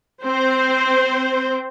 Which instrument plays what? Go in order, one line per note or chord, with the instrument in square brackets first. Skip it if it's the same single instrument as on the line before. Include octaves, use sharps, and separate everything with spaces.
[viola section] C4 C5